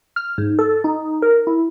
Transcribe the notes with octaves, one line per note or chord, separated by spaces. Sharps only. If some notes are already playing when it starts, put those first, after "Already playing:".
F6
G#2
A4
D#4
A#4
E4